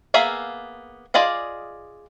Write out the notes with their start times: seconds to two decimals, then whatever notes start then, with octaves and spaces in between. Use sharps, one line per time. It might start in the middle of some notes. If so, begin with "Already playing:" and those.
0.14 A#3 B3 G#4 E5 F5
1.14 F4 G#4 D5 D#5 F5